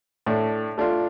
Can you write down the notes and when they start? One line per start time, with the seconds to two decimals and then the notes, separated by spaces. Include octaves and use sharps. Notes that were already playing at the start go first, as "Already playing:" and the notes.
0.26 A2 A3 D4
0.78 A3 D4 F4